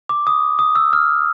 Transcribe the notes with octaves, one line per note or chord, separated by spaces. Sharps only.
D6
D#6
D#6
E6
F6